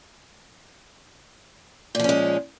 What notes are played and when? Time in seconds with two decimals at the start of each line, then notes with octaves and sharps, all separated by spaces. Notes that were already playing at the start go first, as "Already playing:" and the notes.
1.95 A#2
1.99 F3
2.04 C#4
2.09 G#3